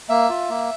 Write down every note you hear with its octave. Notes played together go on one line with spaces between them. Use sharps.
A#3 E5
F4
A#3